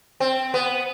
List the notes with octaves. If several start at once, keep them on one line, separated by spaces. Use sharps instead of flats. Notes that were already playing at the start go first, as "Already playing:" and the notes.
C4
B3